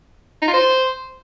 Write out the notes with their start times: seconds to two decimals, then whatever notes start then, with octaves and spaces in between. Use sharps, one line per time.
0.42 D#4
0.48 F4
0.53 C5